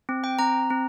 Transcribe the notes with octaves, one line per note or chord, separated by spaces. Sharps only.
C4
G5
C4 A#5
C4